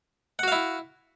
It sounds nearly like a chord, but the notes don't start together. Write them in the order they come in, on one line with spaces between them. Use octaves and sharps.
F#5 F#4 F5 E4